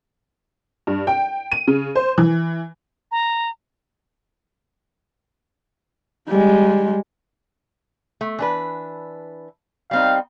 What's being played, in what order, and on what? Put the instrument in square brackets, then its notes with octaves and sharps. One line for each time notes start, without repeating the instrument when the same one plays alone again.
[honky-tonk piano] G2
G5
D#7
C#3
C5
E3
[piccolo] A#5
[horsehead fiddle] G3 G#3
[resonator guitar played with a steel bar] A3
E3 D4 B4
[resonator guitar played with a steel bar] G3 C4 D#4 [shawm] F5